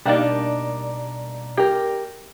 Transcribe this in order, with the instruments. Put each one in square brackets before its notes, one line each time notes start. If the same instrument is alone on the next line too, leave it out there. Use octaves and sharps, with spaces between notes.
[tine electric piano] B2 [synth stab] G3 A#3 D5 [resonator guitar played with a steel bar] D4 D#4
[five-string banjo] G4 A#4